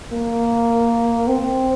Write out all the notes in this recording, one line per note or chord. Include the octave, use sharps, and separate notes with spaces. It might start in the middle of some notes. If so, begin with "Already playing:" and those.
A#3
C4